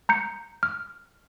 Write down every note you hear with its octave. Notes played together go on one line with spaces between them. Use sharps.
A#5 G6 C#7
F6